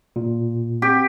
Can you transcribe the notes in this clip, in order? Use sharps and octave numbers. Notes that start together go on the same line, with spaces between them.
A#2
C4 G4